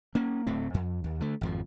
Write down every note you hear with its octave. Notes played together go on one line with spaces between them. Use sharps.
A#3 C#4
D1 A2 A3 C4
F2
D#2
D3 A3
G#1 F2 F3